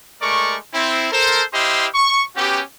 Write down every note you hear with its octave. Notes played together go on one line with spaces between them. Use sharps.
G#3 A3 A#4 D5 C#6
C4 E4
A4 A#4 C5
E4 G4 C5 D#5 F5 C6
C#6
B3 C#4 F#4 G4